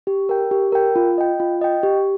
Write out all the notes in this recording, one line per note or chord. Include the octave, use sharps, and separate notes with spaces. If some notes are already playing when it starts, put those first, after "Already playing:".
G4
A#4 G5
G4
A#4 G5
F4
D#5 G5
F4
D#5 G5
G4